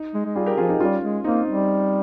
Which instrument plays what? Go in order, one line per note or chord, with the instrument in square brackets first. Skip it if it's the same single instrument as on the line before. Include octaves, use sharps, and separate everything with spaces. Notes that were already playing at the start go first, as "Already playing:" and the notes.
Already playing: [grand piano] D#4
[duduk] G#3
G#3
[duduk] G3 [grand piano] F4 G#4
[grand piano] G4 A#4
[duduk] F3 [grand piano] F4 G#4
[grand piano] D#4 G4
[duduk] G3 [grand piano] C#4 F4
[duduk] G#3
[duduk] A#3 [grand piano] C4 D#4
[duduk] G3